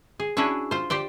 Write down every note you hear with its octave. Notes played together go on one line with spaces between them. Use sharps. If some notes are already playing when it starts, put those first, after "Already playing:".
G#4
C#4 D4 E4 F#4 G#4 C#5
F4 C5
G4 C5 D5 G5